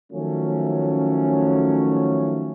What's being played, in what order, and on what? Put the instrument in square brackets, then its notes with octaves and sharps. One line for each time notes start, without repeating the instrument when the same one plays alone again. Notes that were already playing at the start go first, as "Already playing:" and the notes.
[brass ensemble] D#3 F3 F#3 A3 C#4